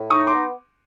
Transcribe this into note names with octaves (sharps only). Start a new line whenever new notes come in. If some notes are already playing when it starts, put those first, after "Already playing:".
Already playing: A2
D#4 C#6 D#6
C6 D6
B3